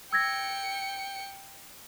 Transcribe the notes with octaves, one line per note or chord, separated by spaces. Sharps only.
G5 E6 G#6 A#6 C#7